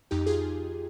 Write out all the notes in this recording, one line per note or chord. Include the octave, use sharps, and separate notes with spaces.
F2 D#4 G4
F4 G#4